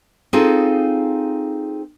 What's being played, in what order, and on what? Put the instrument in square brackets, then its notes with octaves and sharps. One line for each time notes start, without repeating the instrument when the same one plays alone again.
[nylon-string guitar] C4 D#4 F4 G#4 A4